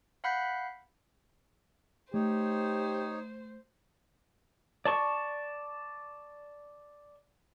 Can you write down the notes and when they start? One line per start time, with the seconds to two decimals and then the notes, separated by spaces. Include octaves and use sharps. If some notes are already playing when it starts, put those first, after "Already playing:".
0.24 F5 F#5 B5 F#6 G6 B6
2.14 A3 D#4 G4 C5 C#5
4.85 D5 A5 C#6